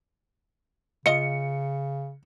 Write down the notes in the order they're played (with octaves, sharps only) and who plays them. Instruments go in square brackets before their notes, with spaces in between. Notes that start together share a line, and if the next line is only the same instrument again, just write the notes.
[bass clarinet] C#3 [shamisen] F4 D#5 [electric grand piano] C#7